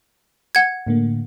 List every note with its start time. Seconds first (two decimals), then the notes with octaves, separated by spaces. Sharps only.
0.55 F#5 G#6
0.87 A2 D3 A#3